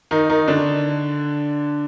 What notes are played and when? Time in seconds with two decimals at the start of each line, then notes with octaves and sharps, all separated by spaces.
0.11 D#3 D#4
0.30 D#3 D#4
0.48 D3 D4